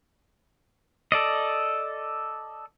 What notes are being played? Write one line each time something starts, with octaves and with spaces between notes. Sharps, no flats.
A4 D5 D#5